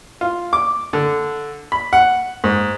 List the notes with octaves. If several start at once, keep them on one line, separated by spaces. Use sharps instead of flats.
F4
D6
D3
B5
F#5
G#2